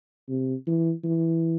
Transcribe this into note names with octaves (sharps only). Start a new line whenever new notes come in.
C3
E3
E3